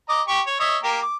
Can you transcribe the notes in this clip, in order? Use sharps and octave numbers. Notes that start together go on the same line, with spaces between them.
D#5 A#5 D6
G4 C#6
C#5
C#5 D#5 E5
A#3 G4 A#4
D6